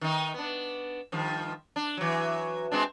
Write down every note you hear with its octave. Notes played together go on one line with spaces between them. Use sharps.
D#3 D#4
B3 D4
G2 D#3 F3
D4
E3 F#3
G#3 C4 D4